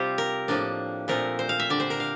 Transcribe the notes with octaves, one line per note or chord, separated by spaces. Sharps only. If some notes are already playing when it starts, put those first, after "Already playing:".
Already playing: C3 G3 C4 F4 G4
A#4
A2 F3 A#3 D4
A#2 F3 A3 C4 A#4
C5
F5
E5
D3 G3 D4 D5
C5
A#4
F5